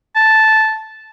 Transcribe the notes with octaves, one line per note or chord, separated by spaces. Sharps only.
A5